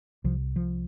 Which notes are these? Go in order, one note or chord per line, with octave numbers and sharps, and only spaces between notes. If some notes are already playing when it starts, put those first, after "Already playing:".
C2 C3 F3
F3